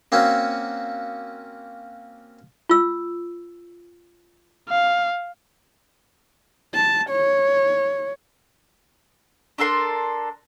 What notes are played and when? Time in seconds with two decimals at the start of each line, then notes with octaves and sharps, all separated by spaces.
0.12 A#3 C4 C#4 F#4
2.69 F4 E6
4.69 F5
6.74 A5
7.10 C#5
9.58 D4 A4 A#4 C6